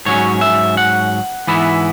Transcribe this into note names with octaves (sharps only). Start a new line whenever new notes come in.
G#2 F#3 C#4 C#5
E5
F#5
G#2 E3 B3 E4